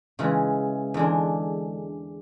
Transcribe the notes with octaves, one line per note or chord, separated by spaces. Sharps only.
C#3 E3 G#3
E2 D3 G#3 D4